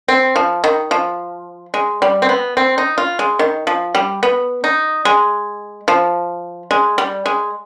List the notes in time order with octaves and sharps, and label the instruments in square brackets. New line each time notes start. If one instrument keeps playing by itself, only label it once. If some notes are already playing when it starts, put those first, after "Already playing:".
[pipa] C4
F3
D#3
F3
G#3
G3
C4
B3
C4
D#4
F4
G#3
D#3
F3
G3
B3
D#4
G#3
F3
G#3
G3
G#3